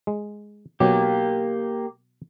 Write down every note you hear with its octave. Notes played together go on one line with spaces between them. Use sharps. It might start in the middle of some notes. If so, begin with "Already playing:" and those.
G#3
B2 F#3 A#3 G4